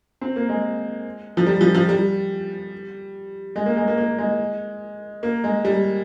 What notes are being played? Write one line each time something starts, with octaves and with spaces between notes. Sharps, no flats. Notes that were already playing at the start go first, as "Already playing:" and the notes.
C4
A#3
G#3
F3
G3
F3
F3
G3
G#3
A#3
G#3
A#3
A#3
G#3
A#3
G#3
G3